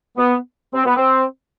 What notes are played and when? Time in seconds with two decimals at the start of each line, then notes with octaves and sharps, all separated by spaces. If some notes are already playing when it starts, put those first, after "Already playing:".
0.17 B3
0.74 C4
0.85 B3
0.96 C4